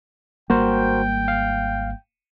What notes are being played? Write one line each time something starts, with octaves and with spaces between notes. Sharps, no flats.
G#1 G3 A#3 F#4 A#4 C5 G5
F5